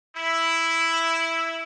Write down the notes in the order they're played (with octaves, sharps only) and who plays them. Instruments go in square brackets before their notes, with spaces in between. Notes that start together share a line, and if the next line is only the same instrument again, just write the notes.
[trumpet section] E4